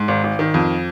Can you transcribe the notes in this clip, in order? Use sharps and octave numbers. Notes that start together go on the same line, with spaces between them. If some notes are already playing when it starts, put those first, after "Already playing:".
Already playing: G#2
G#1
G#1
D#3
F2